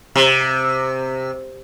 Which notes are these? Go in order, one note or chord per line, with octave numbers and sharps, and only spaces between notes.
C3